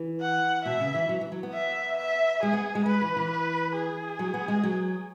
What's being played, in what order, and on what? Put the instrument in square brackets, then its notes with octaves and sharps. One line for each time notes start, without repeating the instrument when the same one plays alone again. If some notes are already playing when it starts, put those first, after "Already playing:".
Already playing: [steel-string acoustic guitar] E3
[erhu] F#5
[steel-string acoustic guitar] B2 [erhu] E5
[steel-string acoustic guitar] C#3
E3
F#3
E3
F#3
B3
[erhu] E5
E5
[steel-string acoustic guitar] G#3 [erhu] G#4
[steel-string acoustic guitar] B3
G#3
[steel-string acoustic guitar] G#3 [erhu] B4
[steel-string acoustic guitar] E3
E3
[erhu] B4
G#4
[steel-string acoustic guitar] F#3
B3
G#3
F#3